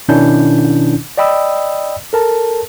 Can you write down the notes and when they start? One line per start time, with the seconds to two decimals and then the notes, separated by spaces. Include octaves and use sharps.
0.08 B2 D#3 C#4 D4 E4 G6
1.17 D5 D#5 G5 B5 D#6 E6
2.13 A4 A#4 A5